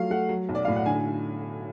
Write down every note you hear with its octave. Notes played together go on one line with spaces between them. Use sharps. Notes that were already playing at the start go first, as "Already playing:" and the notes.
Already playing: F3 F#3 A3 F5
A3 F#5
F#3
B1
D5
A2 F5
F#5
D3 G#5